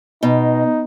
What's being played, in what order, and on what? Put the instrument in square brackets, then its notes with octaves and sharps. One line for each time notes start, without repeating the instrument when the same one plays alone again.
[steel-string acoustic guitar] B2 [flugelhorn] D#4